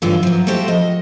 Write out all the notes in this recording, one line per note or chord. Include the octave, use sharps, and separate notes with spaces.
G2 D3 E3 F#3 F4
F3 F#3
F#4 G4 A4 C5 E5 F5
F3 D#5